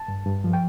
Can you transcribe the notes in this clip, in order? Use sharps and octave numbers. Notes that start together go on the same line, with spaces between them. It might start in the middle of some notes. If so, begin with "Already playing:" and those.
Already playing: A5
G2
G2
F3
G5